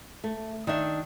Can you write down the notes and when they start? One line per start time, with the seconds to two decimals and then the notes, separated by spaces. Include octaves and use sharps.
0.24 A3
0.67 D#3 D4 E5